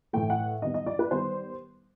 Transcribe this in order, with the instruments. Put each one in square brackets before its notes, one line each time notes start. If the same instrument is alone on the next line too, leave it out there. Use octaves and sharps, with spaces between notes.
[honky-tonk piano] A2 E3 A3 G5
F#5
D#3 G3 B3 D#5
D#5
D5
B4
D#3 G3 B3 C5